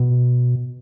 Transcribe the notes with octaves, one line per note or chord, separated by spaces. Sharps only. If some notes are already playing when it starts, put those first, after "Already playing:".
Already playing: B2